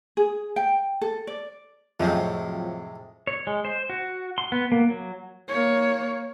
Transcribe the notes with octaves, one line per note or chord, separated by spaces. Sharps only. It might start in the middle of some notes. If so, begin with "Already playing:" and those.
G#4
G5
A4
D5
F2 A2 C3 F3 F#3 G#3 C4
C#5
G#3
C5
F#4
C6
B3
A#3
F#3
A#3 C#5